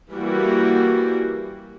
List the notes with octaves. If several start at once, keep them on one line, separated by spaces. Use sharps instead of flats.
E3 G3 A#3 F#4